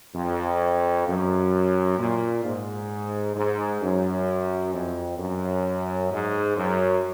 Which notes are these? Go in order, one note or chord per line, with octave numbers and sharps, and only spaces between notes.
F2
F#2
A#2
G#2
G#2
F#2
F2
F#2
G#2
F#2